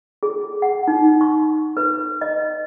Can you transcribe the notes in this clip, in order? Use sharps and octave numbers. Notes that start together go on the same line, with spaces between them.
G#4
F#5
D#4
C#6
B4
D#5